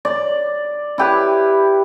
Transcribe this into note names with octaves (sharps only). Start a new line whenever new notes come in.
D5
E4 G4 B4